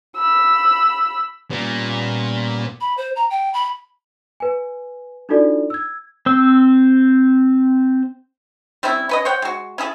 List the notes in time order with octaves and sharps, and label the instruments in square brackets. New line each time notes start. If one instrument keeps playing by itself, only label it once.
[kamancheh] B5 E6
[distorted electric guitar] A#2 [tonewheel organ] G3 B3 C#4
[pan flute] B5
C5
A#5
G5
B5
[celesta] B4 G#5
D4 D#4 F4 F#4 A4 D5
E6 G#6
[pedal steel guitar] C4 E6
[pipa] G3 C4 C#4 E4
C#4 B4 D#5
C5 C#5 F#5 G5
G#3 F#4
C#4 E4 G#4 A4